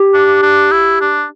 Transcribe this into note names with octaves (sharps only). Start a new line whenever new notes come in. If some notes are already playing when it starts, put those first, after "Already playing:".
Already playing: G4
D4
D4
E4
D4